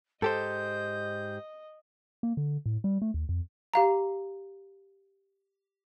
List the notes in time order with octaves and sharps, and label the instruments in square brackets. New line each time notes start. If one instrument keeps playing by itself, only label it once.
[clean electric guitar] G#2 G4 C5 [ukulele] A4 [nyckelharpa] D#5 [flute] G6
[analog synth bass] A#3
D3
A2
G3
A3
D#2
F2
[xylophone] G4 F5 A#5